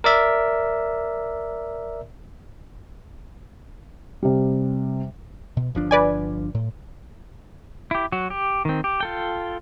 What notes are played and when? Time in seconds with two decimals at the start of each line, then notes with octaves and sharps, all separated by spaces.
0.04 A#4 D5 E5
4.23 C3 G3
5.57 B2
5.75 G1 F3 D4
5.91 B4 D5 G#5
6.55 A2
7.91 E4 G4
8.12 F#3 F#4
8.30 G4
8.65 D#3 C4
8.84 G4
9.00 F4 A4 G5